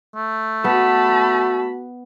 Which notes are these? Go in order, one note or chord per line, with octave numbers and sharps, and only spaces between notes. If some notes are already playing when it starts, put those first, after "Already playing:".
A3
B3 F#4 B4 A5 B5